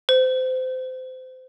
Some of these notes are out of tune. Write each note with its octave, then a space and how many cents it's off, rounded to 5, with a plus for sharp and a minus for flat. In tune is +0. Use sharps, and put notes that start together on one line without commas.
C5 -25